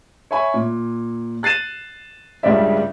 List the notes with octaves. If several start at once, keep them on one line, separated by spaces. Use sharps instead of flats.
C#5 E5 G#5 B5
A#2
F#6 A6 C7 D#7 E7
C#2 G2 C#3 G3 D5 E5